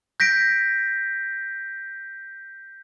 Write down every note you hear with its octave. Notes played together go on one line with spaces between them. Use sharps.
G6 A#6 B6 D7